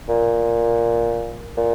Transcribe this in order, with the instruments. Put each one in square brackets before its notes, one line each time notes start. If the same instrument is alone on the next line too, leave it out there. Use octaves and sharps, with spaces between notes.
[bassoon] A#2
A#2